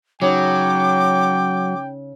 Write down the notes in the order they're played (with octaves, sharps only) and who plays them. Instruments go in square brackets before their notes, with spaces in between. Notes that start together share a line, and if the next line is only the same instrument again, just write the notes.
[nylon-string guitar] C#3 D#4 C#5 [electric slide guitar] F#3 [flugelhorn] G5 [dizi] D6